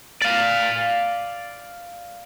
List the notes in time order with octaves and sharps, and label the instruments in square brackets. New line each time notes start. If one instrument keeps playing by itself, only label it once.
[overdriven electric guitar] D5 F5